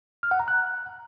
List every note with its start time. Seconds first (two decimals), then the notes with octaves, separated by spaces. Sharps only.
0.23 F6
0.31 F#5
0.40 A#5
0.48 F#6